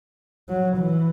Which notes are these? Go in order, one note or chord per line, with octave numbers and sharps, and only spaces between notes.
F#3
E3